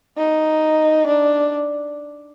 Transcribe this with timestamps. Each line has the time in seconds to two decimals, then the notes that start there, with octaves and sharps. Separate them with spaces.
0.18 D#4
1.07 D4